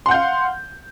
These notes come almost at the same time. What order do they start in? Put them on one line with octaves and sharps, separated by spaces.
C6 F#5 G6 F5